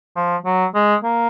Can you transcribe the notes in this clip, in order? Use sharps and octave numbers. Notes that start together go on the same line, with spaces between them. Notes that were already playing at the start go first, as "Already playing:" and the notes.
F3
F#3
G#3
A#3